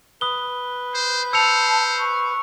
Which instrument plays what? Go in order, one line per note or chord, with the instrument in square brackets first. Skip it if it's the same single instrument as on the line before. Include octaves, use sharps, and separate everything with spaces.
[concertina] B4 [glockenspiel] D#6 G7
[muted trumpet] C5
[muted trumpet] C5 [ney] A5 [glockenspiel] E6 C#7 F7
[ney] C#6